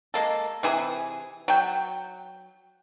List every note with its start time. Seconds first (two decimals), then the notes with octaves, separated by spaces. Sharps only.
0.14 G#3 A#3 A4
0.63 C3 E3 G#4
1.48 F#3 G5